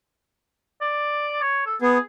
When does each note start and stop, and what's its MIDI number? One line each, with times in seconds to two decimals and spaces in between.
0.81 1.37 74
1.42 1.63 73
1.66 1.76 69
1.82 1.98 59
1.82 2.00 68